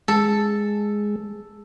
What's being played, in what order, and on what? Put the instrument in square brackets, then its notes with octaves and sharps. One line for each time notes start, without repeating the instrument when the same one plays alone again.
[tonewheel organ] G#3 [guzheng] A4